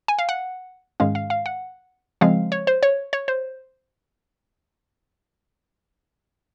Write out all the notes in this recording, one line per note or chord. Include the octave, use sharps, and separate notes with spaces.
G#5
F5
F#5
G#2 D#3 G#3 C#4 F5
F5
F5
F#5
C#3 F3 G#3 C4 F5
C#5
C5
C#5
C#5
C5